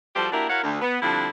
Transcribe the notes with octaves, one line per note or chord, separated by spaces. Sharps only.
F3 G3 F#4 G4 A4 C5
A#3 D4 E4 F#4 G4 A#4
E4 F#4 A#4 C#5 F5 F#5
D2
B3
D3 F3 G3 C4 D4 E4